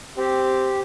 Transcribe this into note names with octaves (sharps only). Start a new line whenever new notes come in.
C4 G4